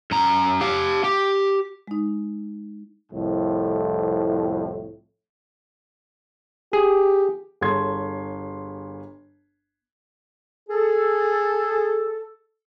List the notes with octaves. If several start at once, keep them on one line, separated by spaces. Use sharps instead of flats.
F#2 A#5
G4 F5
G4
G#3 D#4
C2 F2 A2
G4 G#4
G1 G#4 C#5 C6 G#6
G#4 A4